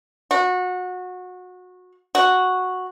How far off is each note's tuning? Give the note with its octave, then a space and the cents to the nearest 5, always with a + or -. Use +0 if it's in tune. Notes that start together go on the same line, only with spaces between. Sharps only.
F#4 -25
F#4 -5